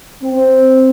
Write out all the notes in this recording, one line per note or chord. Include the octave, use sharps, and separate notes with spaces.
C4